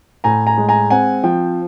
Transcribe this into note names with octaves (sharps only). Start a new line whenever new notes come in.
A2 G#5 A#5
G#5 A#5
G#3
G#5 A#5
C4 F#5 G#5
F3 G5